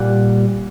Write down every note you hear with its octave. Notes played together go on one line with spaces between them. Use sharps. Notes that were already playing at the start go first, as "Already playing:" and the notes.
Already playing: A#2 G3 A#3 F#5